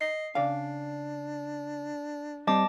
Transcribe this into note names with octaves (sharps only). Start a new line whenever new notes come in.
D#5 C7
C#3 D4 D5 F5
G3 C4 D#5 A5 D6